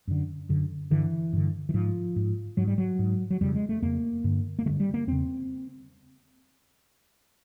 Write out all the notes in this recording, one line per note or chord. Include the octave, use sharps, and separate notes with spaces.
F#2 D3
F#2 D3
G2 D3 E3
G2 D3
E3
G#2 F3
G#2
G#2 F#3
G3
F#3
G#2
F#3
F2 C#3 G3
G#3
A3
F2 C#3 A#3
G2 D3
A#3
G2 D3 A3
G3
A#3
E2 C#3 C4